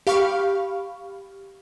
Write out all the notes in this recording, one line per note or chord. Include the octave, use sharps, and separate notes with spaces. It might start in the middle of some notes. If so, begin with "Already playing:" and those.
G4 F5 B5 C#6 F6